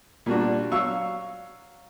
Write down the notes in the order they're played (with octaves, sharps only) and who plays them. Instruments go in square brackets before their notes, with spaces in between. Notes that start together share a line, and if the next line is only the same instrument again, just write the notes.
[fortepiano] A#2 G3 D4 F#4
F#3 F5 C#6 E6